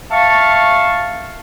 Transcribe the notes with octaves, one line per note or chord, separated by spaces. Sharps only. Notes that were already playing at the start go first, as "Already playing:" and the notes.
E5 F5 A5 C#6